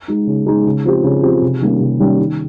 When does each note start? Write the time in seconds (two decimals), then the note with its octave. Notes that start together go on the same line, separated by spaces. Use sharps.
0.08 G#3 D#4
0.27 C#3
0.46 G#3 D#4
0.66 C#3
0.85 F3 C4 G4
1.04 C#3
1.23 F3 C4 G4
1.42 C3
1.61 D#3 G3 A#3 C#4
1.80 C3
1.99 D#3 G3 A#3 C#4
2.19 D#3